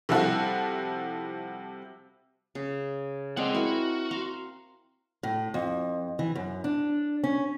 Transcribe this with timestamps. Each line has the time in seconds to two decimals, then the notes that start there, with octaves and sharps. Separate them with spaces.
0.09 C3 F3 G3 E4 F#4 A4
2.55 C#3
3.37 G#3 C4 D5 F#5
3.54 E4 F#4 A#4
4.11 F5 A#5 C6
5.23 A2
5.54 F2
6.19 E3
6.35 F#2
6.64 D4
7.24 C#4